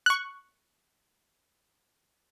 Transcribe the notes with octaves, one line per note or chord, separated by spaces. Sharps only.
C#6 F#6